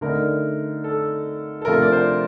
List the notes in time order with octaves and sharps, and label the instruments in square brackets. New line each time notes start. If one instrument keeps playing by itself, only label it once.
[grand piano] D3 A3 D#4 A#4
A4
A4
C3 F3 A3 D4 F4 A#4
D5
C5